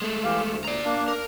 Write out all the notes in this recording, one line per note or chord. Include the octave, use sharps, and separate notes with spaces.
G#3 A3
E3 G4 F5
D2
D5 A#5
A#3 D4
A#4